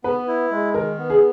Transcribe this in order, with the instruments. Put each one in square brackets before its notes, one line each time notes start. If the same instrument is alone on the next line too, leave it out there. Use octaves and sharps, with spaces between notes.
[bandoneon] B3 [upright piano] B4
[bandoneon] E4
G#3
[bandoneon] D#3 [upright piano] A#4
[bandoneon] B3
[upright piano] G#4